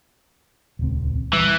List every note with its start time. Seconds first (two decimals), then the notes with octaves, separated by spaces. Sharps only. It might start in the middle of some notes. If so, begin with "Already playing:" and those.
0.79 D#1 C#2 C4
1.33 E3 G3